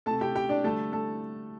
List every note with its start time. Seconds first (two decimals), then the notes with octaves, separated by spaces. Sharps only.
0.06 C3 A3 A4 A5
0.21 G4 G5
0.35 G4 G5
0.49 D4 D5
0.64 D3 G3 A3 A4
0.92 A3 A4